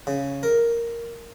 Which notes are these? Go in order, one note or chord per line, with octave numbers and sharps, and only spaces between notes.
C#3
A#4